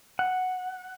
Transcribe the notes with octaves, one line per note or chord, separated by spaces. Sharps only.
F#5